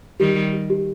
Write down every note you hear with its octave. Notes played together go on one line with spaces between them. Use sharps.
D#3 G3 G4
G4
G4
G4